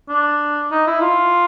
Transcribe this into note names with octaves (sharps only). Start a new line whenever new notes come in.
D4
D#4
E4
F4